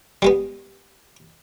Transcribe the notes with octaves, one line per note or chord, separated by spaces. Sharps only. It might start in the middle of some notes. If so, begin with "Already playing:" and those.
G3 G#3 B3